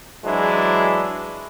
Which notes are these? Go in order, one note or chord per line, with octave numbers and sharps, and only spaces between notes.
E3 F#3 G#3 D4 E4